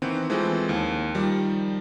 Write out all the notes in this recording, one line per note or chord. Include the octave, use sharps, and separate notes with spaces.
D#3 E3 B3 C4
E3 F3 G#3 A3 C4
D#2
D#3 F3 G3